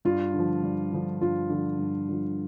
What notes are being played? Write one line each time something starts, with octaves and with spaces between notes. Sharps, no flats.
G2 F4
D3
F3
G2
D3 F3
G2 F4
D3 F3
G2
D3 F3